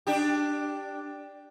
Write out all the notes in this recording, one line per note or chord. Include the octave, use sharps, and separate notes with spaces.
D4 G4